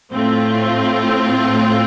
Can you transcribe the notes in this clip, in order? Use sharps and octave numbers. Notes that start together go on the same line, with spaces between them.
A2 A3 C4 F4